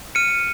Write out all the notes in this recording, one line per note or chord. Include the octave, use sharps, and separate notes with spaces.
F6 C#7 D#7